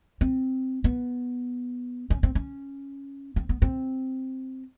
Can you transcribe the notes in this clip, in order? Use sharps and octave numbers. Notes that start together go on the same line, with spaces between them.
C4
B3
C#4
C4
C#4
C4
B3
C4